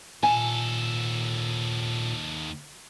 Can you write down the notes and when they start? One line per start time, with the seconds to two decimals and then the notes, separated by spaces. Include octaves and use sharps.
0.23 D#2 A#2 A4 G#5